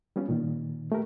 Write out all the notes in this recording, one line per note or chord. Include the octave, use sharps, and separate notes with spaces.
G3 B3 C#4 F4
A#2 D#3
A3 G4 A#4